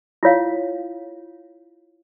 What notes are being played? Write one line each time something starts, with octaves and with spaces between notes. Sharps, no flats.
E4 F4 C#5 F5